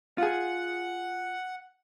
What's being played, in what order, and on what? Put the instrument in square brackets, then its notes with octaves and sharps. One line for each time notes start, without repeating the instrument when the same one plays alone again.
[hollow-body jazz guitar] F4 G#4 [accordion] F#5